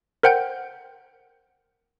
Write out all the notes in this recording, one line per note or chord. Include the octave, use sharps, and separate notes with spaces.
A#4 C5 F#5 G5 G6